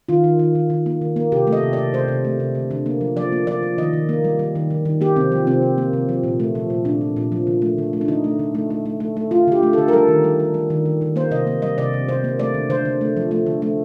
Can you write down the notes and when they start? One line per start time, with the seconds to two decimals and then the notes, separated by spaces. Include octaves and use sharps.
0.09 D#3 F4
0.24 D#3
0.39 D#3
0.55 D#3
0.70 D#3
0.86 A#3
1.01 D#3
1.16 A#3
1.32 C3 G4
1.47 A3
1.53 D#5
1.63 C3
1.73 D5
1.78 C3
1.93 C3 C5
2.08 C3
2.25 A3
2.40 C3
2.55 D3
2.71 D3
2.86 A#3
3.01 F3
3.16 F3 D5
3.32 A#3
3.47 F3 D5
3.63 F3
3.78 D#3 D#5
3.93 D#3
4.09 A#3
4.24 G3
4.39 G3
4.55 D#3
4.70 D#3
4.85 D#3
5.01 A#3 G4
5.16 C3 C4
5.32 F3
5.47 C3 C4
5.62 C3
5.78 A#3
5.93 C3
6.09 F3
6.24 A#2
6.40 A3
6.55 F3
6.70 A#2
6.85 A#2 D4
7.01 F3
7.17 A#2
7.32 F3
7.47 D3
7.62 A3
7.78 D3
7.93 A3
8.01 D4
8.08 D3 D#4
8.24 A3
8.39 D3
8.55 A3
8.70 A3
8.86 A3
9.00 A3
9.17 A3
9.31 A3 F4
9.48 D3 G4
9.63 A3
9.73 A4
9.78 D3
9.88 A#4
9.93 G3 A4
10.08 D#3
10.24 G3
10.40 G3
10.54 G3
10.70 D#3
10.85 D#3
11.01 D#3
11.16 A#3 C5
11.31 C3 D#5
11.47 A#3
11.62 G3 D#5
11.78 C3 D5
11.93 C3
12.09 C3 C5
12.24 A#3
12.39 A3 D5
12.54 D3
12.70 D3 C5
12.85 D3
13.01 A3
13.17 F3
13.31 A3
13.46 D3
13.62 A3